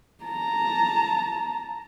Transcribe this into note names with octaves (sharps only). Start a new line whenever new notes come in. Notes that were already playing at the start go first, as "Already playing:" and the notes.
A5 A#5